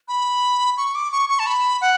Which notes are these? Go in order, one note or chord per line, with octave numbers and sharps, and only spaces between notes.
B5
C#6
D6
C#6
C#6
A5
B5
F#5